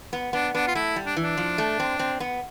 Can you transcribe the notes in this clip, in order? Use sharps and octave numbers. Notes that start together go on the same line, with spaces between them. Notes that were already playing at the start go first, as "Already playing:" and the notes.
B3
B3 D4
B3 D4
F4
A3 E4
G3
D4
E3
D4
F3
A3
C4
C4
B3